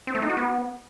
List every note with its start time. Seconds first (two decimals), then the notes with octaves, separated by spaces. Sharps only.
0.07 C4
0.15 A3
0.22 D#4
0.30 F#4
0.37 B3